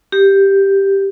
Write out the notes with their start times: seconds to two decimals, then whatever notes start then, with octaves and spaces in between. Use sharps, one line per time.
0.12 G4